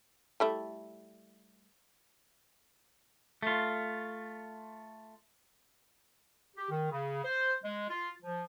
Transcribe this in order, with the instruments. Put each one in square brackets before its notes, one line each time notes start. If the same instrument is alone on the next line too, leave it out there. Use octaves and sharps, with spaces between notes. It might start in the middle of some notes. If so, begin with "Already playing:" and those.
[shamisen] G3 A3 E4
[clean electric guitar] A3 F4
[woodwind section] G4
D#3
C#3
C5
G#3
F4
F3